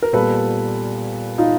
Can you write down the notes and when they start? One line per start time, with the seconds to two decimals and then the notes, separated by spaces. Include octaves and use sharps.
0.02 A#4
0.13 A#2 G3 B3 A4 B4
1.38 D#4 F4